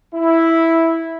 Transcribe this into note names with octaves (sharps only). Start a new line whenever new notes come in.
E4